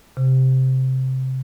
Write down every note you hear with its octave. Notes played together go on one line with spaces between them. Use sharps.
C3